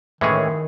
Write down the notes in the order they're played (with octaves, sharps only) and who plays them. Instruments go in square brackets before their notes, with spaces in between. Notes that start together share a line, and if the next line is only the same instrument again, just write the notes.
[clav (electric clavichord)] A2 E3 G#3 C#4 G#4 [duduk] D#3